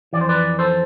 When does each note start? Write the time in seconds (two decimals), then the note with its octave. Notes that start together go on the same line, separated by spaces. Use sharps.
0.13 E3 D5
0.16 F2 C5
0.29 B4 D5
0.59 A4 C5